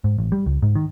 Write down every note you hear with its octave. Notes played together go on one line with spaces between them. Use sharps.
G#2
A1
G3
C#2
G#2
D#3